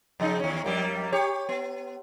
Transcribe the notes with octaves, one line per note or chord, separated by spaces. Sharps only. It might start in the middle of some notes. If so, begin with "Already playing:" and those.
F2 C#3 D#4
D#2 C#4
F2 G3 A#3
G4 C#5
B3